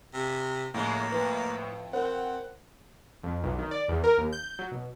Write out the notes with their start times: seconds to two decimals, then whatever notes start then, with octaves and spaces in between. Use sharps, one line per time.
0.14 C3
0.74 A2 C#3 F3 G#3 A#3
1.12 F2 E4 B4
1.93 C4 A#4 C5 F#5
3.23 F2
3.44 B1
3.59 D#3
3.71 D5
3.88 E2
4.04 A#4
4.18 D#2
4.32 G6
4.59 F#3
4.71 B2